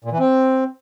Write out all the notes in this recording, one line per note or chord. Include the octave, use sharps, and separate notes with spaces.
A#2
E3
C4